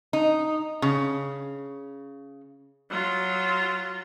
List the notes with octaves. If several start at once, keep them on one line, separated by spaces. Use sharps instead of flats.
D#4
C#3
F#3 F4